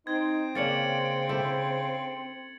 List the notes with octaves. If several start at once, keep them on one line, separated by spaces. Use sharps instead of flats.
C4 D#4 G#6
C#3 A#3 C#4 D4 A6 C#7 F#7
E4 G4 A4